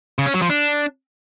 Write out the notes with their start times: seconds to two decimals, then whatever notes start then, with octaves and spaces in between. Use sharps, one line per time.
0.19 C#3
0.26 C#4
0.34 F#3
0.42 F3
0.50 D4